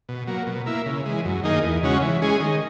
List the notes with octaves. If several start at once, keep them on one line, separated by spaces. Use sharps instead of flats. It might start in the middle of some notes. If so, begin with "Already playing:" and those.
B2
F#3 A#3
B2
A#3 E4
C#3
E3 G#3
F#2
D#3 A#3 D#4 G#4
E2
C#3 G#3 C#4 F#4
E3
G#3 C#4 G#4
D#3